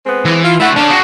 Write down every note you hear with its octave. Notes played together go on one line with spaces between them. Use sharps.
G#3 B3 C4
E3
F4
D3 A3 E4 F#5
C#4 D4 F5
F#4 G#4